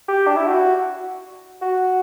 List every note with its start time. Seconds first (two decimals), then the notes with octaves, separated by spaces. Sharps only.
0.08 G4
0.27 D4
0.37 E4
0.47 F#4
1.62 F#4